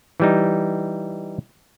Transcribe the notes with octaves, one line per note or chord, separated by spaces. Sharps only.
E3 G3 D#4